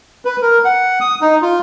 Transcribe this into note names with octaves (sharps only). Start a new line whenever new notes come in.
B4
A#4
F#5
D#6
D#4
F4